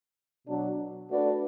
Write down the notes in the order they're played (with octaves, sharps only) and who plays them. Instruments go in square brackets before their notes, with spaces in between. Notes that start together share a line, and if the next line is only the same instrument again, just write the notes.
[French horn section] B2 F#3 D4
A3 D4 F#4 B4 D5